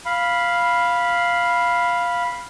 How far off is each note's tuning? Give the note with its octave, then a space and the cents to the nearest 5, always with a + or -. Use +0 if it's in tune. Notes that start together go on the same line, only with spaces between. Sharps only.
F5 +0 B5 -5